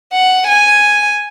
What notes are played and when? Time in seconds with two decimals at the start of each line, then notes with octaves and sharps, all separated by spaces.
0.13 F#5
0.47 G#5